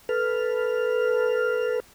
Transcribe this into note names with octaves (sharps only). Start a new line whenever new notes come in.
A4 B4 F6